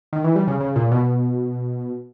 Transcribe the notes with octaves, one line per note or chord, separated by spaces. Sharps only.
D#3
E3
G3
C#3
C#3
A#2
B2